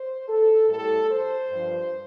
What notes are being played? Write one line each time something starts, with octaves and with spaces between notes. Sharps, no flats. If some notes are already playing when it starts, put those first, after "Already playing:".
Already playing: C5
A4
A2 G3 A4
C5
G2 F3